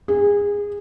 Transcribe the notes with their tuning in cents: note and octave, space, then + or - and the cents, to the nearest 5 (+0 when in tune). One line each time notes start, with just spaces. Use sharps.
G#4 -25